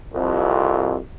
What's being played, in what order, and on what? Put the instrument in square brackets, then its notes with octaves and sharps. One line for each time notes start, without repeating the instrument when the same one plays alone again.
[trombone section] C2 F2